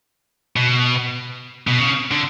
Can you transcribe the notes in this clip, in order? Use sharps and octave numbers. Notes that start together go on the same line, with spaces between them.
B2
B2
C#3
D3